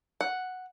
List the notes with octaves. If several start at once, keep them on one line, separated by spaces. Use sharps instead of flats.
F#5